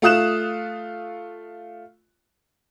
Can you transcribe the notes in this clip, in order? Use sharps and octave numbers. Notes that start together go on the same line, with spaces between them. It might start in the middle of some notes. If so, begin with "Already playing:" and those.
A3 F4 D#6 F#6 E7